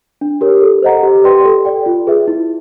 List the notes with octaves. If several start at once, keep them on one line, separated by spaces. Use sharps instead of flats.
D4
G4 A#4 C#5
A4
C5 D#5 F#5 A#5
G4
B4 D5 G5 C6
A4
D5 G5
F4
G#4 B4 E5
E4